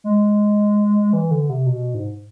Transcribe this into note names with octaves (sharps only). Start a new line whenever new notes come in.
G#3
E3
D3
C3
B2
G#2